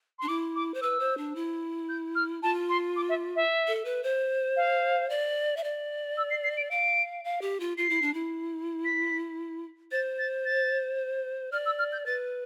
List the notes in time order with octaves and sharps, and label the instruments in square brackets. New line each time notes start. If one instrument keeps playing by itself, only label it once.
[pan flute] D4 [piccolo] C6
[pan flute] E4 [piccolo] D6
[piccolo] D6
[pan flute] C5
[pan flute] B4 [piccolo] E6
[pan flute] C5
D4
E4
[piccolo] G6
F6
[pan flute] F4 [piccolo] A5
[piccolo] C6
D6
E5
E5
[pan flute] A4
B4
C5
[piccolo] F5
[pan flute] D5
E5
D5
[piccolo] E6
C7
C7
D7
[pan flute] F5 [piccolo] D7
[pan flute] F5
G4
F4
[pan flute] F4 [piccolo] C7
[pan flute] E4
D4
E4
[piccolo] B6
[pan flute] C5 [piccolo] A6
[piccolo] A6
A6
[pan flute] D5 [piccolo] F6
[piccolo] E6
F6
G6
[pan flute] B4 [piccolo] A6